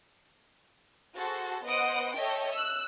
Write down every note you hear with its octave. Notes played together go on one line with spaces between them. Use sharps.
F#4 G#4 A4 C5
B3 C5 D#5 F#5 D#6 D7
A4 C#5 D#5 E5 G5
E6 F#6